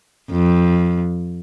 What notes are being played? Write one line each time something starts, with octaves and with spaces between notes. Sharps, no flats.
F2